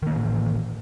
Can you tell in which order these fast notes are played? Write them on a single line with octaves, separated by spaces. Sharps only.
D#3 A#3 E3 A2